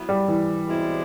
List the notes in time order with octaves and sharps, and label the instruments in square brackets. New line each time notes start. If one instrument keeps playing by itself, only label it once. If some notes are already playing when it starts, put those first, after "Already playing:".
Already playing: [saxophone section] F#3 B3 E4
[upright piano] G3
E3
[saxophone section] B2 G#3 C4 E4